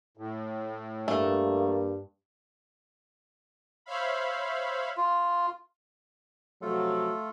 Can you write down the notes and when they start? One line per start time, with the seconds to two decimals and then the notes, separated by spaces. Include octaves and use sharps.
0.17 A2
1.08 G2 A3 A#3
3.86 C5 C#5 E5 F5 B5
4.97 F4
6.62 C3 F3 F#3 A3 F4 A4